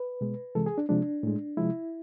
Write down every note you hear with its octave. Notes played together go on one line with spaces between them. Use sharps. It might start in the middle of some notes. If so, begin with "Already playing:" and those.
Already playing: B4
B2 G#3
C3 E3 G#3 A4
G#4
D4
C3 F3 G#3 D4
A2 G#3
C3 F3 G#3 E4